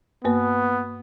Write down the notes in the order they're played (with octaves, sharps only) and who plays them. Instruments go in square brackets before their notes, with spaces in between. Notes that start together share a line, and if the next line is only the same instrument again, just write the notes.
[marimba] G2 A#3 B4 [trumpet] B3